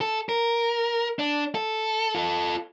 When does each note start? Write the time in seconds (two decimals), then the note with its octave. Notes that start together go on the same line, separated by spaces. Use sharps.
0.01 A4
0.29 A#4
1.19 D4
1.55 A4
2.15 F4 A4